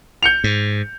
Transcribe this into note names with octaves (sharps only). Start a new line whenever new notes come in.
G6 C#7 F7
G#2